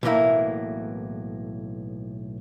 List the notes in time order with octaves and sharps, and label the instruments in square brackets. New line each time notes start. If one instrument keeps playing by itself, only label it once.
[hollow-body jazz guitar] B1 A2 E3 G#3 A#3 E4